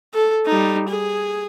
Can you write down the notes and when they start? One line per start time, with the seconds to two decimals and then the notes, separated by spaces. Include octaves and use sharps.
0.14 A4
0.47 G3 D#4
0.88 G#4